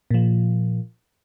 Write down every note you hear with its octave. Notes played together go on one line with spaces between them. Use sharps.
A#2 F3